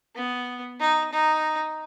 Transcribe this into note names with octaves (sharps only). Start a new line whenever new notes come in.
B3
D#4
D#4